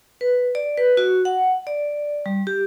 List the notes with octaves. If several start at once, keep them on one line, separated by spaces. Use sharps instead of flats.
B4
D5
B4
F#4
F#5
D5
G3
G4